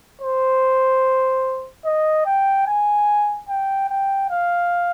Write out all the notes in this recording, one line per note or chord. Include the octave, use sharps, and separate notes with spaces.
C5
D#5
G5
G#5
G5
G5
F5